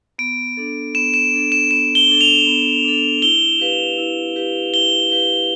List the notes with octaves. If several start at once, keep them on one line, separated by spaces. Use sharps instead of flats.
B3 D7
D4 A4
B3 E7
E7
D4 A4
E7
B3 E7
G7
D4 A4
F7
B3
D4 A4
E4 G7
G4 B4 F5
E4
G4 B4 F5
E4 G7
G4 B4 F5 G7